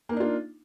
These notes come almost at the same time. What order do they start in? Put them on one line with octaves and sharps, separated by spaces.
A#3 D#4 D4 F4